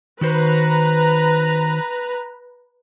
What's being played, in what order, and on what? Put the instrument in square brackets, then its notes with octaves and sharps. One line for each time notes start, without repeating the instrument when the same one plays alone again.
[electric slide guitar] D#3 F#4 C5 [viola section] B4 A#5